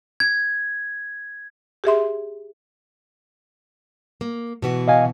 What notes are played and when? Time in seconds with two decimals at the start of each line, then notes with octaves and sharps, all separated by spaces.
0.20 G#6
1.84 G4 G#4 E5 C6
4.21 A#3
4.62 B2 E3 F#4
4.88 D#5 F5 G#5